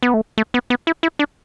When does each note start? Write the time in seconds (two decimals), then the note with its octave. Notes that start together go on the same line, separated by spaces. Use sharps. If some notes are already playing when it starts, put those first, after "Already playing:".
0.03 B3
0.14 A3
0.38 A3
0.54 B3
0.70 B3
0.87 E4
1.03 E4
1.19 D4